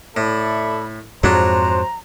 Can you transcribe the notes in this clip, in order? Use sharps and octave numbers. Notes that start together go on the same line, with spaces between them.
A2 A4 D5 E5 B5
F2 G#2 F#3 D4 C5 A#5